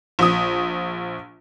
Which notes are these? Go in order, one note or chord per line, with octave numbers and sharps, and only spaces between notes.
A#1 D#6